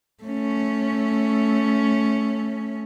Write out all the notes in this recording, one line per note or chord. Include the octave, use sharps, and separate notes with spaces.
A3 C#4